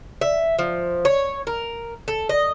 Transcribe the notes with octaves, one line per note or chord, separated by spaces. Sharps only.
E5
F3
C#5
A#4
A4
D#5